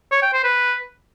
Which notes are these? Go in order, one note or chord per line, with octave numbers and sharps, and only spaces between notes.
C#5
G5
C5
B4